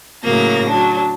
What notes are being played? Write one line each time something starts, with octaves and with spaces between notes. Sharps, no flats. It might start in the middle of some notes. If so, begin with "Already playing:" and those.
A2 C#3 F#3 A#3 A#6
F#3 D4